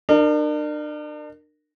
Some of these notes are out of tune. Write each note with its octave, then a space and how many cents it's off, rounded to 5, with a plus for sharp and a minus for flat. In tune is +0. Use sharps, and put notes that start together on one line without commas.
D4 +40 A#4 -10